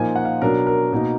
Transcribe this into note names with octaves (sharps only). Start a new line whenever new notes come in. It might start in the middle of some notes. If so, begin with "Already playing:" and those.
Already playing: A#2 F3 A#3 D#4 G#5
F#5
F5
B2 F#3 D4 A#4
A#4
B2 A#3 D#4